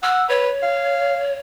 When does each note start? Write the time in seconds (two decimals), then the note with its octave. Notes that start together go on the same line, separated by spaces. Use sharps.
0.03 F#5 E6
0.29 B4 C#5
0.63 F5